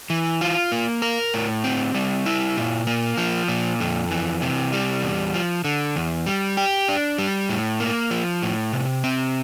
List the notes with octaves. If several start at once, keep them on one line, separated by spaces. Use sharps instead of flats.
E3
F4
A#3
A#4
A2
C4
G3
E4
A#2
A#3
F3
A#2
F2
E3
C3
G3
E2
F3
D3
E2
G3
G4
D4
G3
A2
A#3
F3
A2
C3
C4